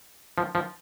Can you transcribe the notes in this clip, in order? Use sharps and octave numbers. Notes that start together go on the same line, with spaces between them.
F3
F3